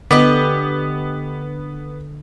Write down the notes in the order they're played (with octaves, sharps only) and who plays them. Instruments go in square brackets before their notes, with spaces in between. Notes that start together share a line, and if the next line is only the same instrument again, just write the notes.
[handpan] D3 [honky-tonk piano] B3 [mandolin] G4 B4 D#5